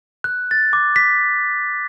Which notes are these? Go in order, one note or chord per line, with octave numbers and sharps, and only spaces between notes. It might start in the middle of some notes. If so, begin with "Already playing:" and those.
F#6
A6
D6
B6